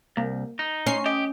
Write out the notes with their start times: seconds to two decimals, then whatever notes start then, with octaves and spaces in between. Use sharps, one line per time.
0.17 C2 A#3
0.59 D#4
0.87 C#4 C6 C#6 C7
1.06 G4 D#5